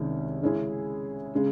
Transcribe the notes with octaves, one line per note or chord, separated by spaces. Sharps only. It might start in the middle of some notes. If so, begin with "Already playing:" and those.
Already playing: C2 C3 D#3 G#3 C#4
C#3 G#3 C#4 E4 G#4
C#3 G#3